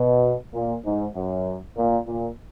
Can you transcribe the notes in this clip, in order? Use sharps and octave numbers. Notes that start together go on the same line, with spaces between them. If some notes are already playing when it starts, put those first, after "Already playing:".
Already playing: B2
A#2
G#2
F#2
A#2
A#2